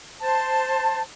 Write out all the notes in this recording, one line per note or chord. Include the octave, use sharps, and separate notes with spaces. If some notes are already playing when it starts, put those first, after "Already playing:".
C5 A5